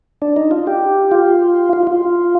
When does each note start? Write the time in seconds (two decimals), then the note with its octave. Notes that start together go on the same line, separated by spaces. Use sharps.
0.22 D4
0.36 D#4
0.51 F4
0.67 G4
1.11 F4
1.73 F4
1.87 F4